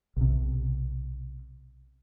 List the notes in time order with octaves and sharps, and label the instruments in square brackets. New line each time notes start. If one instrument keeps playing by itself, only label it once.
[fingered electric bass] B1 C3